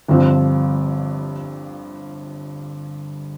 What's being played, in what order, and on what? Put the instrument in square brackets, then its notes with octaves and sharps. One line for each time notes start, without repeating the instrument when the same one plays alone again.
[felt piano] G1 G2 F3 C4